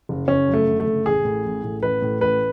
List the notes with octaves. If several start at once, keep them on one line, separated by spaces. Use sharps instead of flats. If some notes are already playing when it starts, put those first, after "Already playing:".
F#1
F#1 C#4
F#2
A3
D3
A3
F#1
A1 G#4
A2
A1
A2
A1 B4
A2
A1 B4